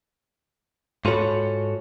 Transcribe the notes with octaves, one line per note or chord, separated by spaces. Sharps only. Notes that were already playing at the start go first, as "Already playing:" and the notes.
G#2 F4 F#4 A4 C#5 B5